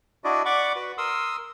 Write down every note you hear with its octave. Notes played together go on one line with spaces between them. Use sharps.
D4 E4 F#4 D5 D#5
D5 F#5 B5 C#6 D6
F#4 B4
A#4 C6 D#6 E6